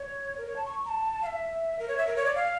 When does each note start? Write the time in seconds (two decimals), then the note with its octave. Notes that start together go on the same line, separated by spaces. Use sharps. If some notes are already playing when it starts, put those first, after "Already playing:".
Already playing: C#5
0.38 A#4
0.47 C#5
0.56 A5
0.66 C#6
0.85 A#5
0.89 A5
1.23 F5
1.26 E5
1.79 A#4
1.88 C#5
1.98 E5
2.07 A#4
2.16 C#5
2.25 D5
2.35 F5